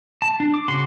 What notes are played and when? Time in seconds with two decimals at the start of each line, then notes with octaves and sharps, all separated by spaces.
0.22 A5
0.40 D4
0.54 D6
0.68 C#3 F#4 C6